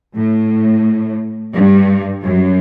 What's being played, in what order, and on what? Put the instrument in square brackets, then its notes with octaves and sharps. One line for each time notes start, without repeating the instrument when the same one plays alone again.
[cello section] A2
G2
F#2